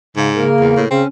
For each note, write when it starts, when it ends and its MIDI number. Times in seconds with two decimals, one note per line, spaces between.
0.16 0.46 44
0.16 0.30 49
0.36 0.83 49
0.36 0.85 58
0.36 0.85 70
0.60 0.74 40
0.76 0.88 45
0.91 1.02 49
0.91 1.03 60
0.91 1.07 61